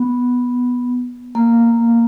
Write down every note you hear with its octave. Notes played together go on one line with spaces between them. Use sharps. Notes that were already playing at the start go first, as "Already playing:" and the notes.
Already playing: B3
A#3